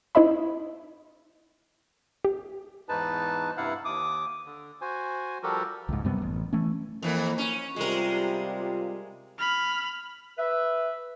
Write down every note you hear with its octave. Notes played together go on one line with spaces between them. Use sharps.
D#4 E4 C5 D#5 E5 B5
G4
E2 G#2 D#4 B4 A5
G2 C3 E4 F5 F#5
D#2 D6 D#6
D3
F#4 C5 G#5
F3 G3 F#4 G4 A4 A#4
C#2 G#2
F#2 C3 G3 B3
A1
E3 A3 C#4
F2 E3 A#3
C#4
C3 G3 G#3 F4 A#4
B5 F6
B4 E5